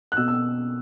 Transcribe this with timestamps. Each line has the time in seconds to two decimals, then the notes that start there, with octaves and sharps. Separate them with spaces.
0.12 F#6
0.17 B2 E6
0.28 E6